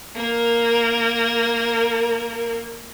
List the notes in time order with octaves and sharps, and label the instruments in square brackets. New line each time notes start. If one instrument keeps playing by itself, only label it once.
[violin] A#3 A#4